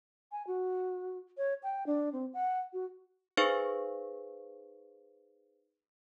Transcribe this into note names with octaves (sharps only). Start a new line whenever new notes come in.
G#5
F#4
C#5
G5
D4
C4
F#5
F#4
D#4 G#4 B4 C5 F5 C#6